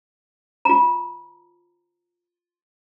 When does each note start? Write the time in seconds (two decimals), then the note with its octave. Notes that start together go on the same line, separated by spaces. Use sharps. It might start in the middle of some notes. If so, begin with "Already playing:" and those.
0.65 F4 A#5